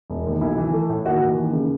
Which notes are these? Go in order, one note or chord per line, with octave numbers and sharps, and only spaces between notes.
E1
D#2
B1 E4
E3
A3
A2
D#2 F#4
E3
D#2
C#3